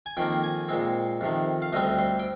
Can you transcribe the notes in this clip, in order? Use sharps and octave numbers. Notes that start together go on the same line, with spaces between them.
G#5
F2 D#3 A#3 G5
G#5
A#2 G#3 C4
F2 C3 D#3
F5
D2 D3 G3 C4 D#5
C5
G5